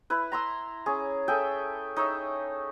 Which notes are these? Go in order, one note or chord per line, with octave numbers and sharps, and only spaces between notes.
E4 B4
A#5 C6 E6
C#4 G#4
G#4 A4 E5 G5
D#4 C#5 E5